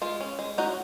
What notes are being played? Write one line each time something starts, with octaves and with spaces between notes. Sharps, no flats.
G#3 F4
C#4
G#3
C#4 D#4 F#4